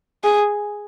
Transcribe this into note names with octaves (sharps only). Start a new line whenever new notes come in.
G#4